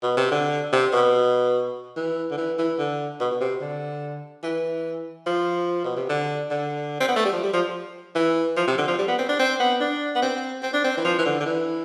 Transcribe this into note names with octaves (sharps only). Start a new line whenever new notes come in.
B2
C3
D3
C3
B2
E3
D3
E3
E3
D3
B2
B2
C3
D3
E3
F3
B2
C3
D3
D3
C4
B3
A3
G3
F3
G3
F3
E3
F3
C3
D3
F3
G3
B3
C4
D4
C4
B3
D4
B3
C4
C4
D4
C4
E3
F3
E3
D3
D3
E3